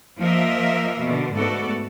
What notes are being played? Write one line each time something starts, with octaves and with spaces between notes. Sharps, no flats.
F3 A#3 A#4 D#5 E5
B2 D3
G#2 A3 B3 F#4 A4 D5